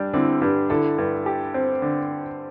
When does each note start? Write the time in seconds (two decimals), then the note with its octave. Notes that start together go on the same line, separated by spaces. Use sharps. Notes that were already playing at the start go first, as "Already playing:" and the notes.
Already playing: G2 G3 D4
0.14 D3 C4 E4
0.41 G2 D4 G4
0.70 D3 E4 A4
0.98 G2
1.26 G4
1.54 C4
1.82 D3